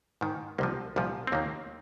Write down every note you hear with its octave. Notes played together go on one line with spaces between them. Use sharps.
G#2 D#3
C2 C3 F3 A#3
C2 A#2 F3
C4
D#2 D#3 A#3